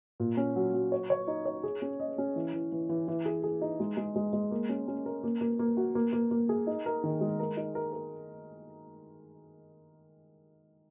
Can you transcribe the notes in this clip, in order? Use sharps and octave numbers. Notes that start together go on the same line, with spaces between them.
A#2
C#4
F#3
F#3
C#5
C#5
D#4
C#5
G#4
C#4
D#5
C#4
E3
E3
E3
E3
E3
G#4
G#4
D#4
G#3
G#3
G#3
G#3
A#3
C#4
C#4
A#4
A#3
A#3
A#3
F#4
A#3
A#3
A#3
G#4
D#4
A#4
D#3
G#3
A#4
D#4
A#4
A#4